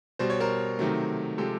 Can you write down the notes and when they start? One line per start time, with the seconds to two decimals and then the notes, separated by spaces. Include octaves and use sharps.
0.19 B2 G3 C5
0.30 C#5
0.40 A#4 C5
0.79 C3 D#3 F#3 A3
1.38 C3 F3 G#3 G4 A4